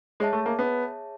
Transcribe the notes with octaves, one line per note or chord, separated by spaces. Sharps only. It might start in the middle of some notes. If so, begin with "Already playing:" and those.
G#3 G#4 C#5 E5 A5
A3
A#3
B3